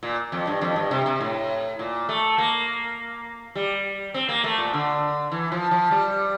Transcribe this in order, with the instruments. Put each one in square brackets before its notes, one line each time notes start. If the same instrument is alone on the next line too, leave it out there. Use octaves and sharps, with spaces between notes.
[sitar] A#2
F2
G2
F2
G2
C3
C3
A2
A#2
A3
A#3
G3
C4
A#3
A3
A#2
D3
E3
F3
F3
G3